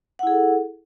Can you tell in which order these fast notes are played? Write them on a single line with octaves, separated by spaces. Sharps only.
F#5 E4 G#4 A4